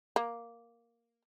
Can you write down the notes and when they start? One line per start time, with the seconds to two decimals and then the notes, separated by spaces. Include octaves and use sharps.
0.16 A#3